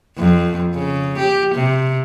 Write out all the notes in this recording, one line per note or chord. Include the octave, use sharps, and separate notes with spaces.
F2
C#3
G4
C3